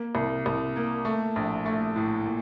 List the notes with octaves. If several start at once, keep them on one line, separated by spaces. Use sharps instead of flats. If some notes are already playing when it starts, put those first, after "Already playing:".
Already playing: A#3
C2
C2
A#3
A3
A#1
A3
A2
A#2